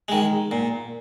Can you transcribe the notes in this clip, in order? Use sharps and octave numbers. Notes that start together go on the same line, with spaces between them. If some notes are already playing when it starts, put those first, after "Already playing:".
D#3 G#3
A#2